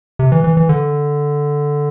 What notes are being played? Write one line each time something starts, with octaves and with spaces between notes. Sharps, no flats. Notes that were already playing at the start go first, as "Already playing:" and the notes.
C3
E3
E3
E3
D3